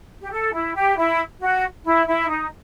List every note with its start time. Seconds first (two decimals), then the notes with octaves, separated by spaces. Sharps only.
0.20 G4
0.31 A4
0.52 E4
0.75 G4
0.97 E4
1.41 F#4
1.84 E4
2.07 E4
2.29 D#4